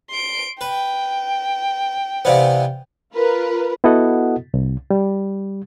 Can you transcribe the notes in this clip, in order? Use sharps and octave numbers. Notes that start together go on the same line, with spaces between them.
C6 D7
B4 G5
C3 E3 B3 C5 D5 F5
F4 A#4 B4
B3 E4 F#4 A4 D#5 F#5
C2
G3